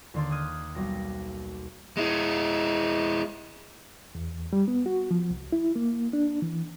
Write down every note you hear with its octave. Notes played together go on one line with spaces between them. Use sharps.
D#2 D3 C6 D6 A6
D#6 F6 F#6 G#6 D#7
B1 G3 A#6
G#3 E4
E2
G3
B3
F#4
F3
C2
E4
A#3
D4
E3